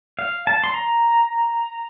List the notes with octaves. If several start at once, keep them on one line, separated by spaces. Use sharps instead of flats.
F5
A5
C6
A#5